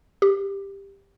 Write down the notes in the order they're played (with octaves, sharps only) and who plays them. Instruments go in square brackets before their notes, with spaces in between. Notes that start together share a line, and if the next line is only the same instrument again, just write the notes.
[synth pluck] G4